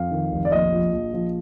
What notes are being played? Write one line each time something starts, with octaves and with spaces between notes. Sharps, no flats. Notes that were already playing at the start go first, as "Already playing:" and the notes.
Already playing: F2 F5
D#3
F1
D5
A#1 D#5
F3
A#1
F3